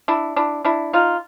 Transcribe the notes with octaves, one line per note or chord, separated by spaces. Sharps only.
D4 E4
D4 E4
D4 E4
D#4 F4